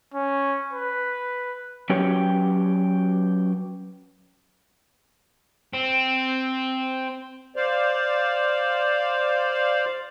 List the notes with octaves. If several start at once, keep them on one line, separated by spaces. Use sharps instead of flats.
C#4
B4
F#3 C#4 F#4 G4 B4 C#5
C4
C5 D5 F5